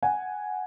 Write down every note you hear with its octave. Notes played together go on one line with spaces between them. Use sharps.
F#5 G#5